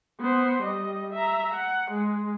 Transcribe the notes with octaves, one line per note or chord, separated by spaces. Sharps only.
B3 C5
G3 D#5
E5 A#5
F#5
G#3